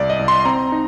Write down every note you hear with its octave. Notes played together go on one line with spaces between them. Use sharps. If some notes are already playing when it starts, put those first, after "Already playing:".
Already playing: C2 D5
D#5
C2
C6
C4 A#5
D#4